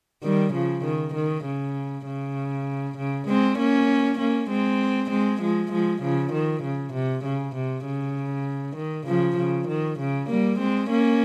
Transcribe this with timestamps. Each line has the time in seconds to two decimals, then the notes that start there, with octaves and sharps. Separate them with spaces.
0.23 D#3 G3
0.54 C#3 F3
0.85 D#3
1.15 D#3
1.45 C#3
2.06 C#3
2.97 C#3
3.28 G#3 C4
3.59 A#3 C#4
4.19 A#3 C#4
4.50 G#3 C4
5.10 G#3 C4
5.42 F3 G#3
5.72 F3 G#3
6.02 C#3 F3
6.33 D#3
6.63 C#3
6.93 C3
7.24 C#3
7.56 C3
7.85 C#3
8.77 D#3
9.07 C#3 F3
9.37 C#3
9.68 D#3
9.99 C#3
10.30 G3 A#3
10.59 G#3 C4
10.90 A#3 C#4